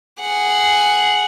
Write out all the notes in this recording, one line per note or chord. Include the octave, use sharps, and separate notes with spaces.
G#4 F#5